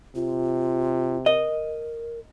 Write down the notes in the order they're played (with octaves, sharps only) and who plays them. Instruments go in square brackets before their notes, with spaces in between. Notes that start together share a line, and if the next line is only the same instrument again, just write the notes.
[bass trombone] C3 [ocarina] F4
[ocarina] A#4 [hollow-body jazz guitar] D#5